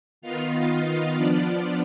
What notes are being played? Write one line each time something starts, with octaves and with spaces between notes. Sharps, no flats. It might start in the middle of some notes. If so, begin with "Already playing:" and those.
D#3 B3 D#4 F4 F5
F3 B3 D4 F4 D5